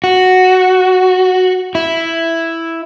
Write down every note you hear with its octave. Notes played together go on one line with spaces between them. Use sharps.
F#4
E4